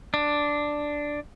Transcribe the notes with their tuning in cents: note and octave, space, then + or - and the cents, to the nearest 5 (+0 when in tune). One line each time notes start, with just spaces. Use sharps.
D4 +0